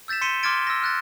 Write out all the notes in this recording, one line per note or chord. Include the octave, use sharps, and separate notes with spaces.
E6 G6 A6 B6 E7
C6 B6 C#7 D#7 E7 G7
C6 D6 F6 G#6 A6 D7
E6 A#6
F6 F#6 A6